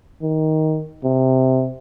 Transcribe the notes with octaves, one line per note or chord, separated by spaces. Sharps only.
D#3
C3